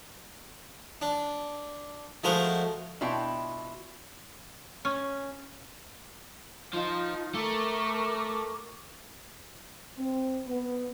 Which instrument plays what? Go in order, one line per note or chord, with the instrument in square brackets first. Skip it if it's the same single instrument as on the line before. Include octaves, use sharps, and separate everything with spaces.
[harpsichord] D4
F3 G#3 A3 F#4 A#4 C5
[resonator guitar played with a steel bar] B2 D4 E4 F4 G5
[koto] C#4
[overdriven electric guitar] F3 [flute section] D#4 F4
[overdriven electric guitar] A3 [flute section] A#4 C#6 D6
[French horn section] C4
B3